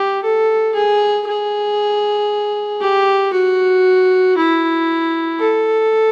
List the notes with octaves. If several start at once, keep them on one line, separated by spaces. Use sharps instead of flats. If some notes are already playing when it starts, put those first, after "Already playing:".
Already playing: G4
A4
G#4
G#4
G4
F#4
E4
A4